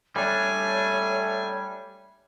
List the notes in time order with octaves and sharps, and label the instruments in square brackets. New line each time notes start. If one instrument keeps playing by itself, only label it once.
[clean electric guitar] G3 D4 [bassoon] A3 [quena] C#5 [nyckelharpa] G#5